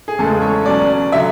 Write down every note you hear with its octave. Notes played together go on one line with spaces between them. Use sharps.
G#4
E2 C#3 G#3 A4
C#5
B2 F#3 C#4 D5
D3 F#3 E5